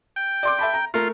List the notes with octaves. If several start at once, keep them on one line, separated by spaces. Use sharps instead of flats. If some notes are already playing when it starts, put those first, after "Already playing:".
G5
D5 C6 D6
E5 A5 B5
A#5
A3 F4 A#4